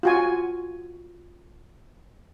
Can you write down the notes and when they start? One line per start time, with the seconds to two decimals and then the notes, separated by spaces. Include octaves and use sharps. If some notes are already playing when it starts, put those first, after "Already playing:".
0.03 F4 F#4 G#5